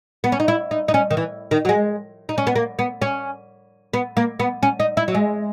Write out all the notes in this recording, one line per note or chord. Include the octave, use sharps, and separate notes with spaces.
B3
C#4
D#4
E4
D#4
D#4
C#4
D#3
E3
D#3
F#3
G#3
D#4
C#4
B3
A#3
B3
C#4
B3
A#3
B3
C#4
D#4
E4
F#3
G#3